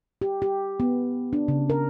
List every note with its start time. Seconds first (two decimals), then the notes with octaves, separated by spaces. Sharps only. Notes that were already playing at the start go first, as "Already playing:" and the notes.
0.22 G4
0.42 G4
0.80 B3
1.33 D4
1.48 C#3
1.70 A#4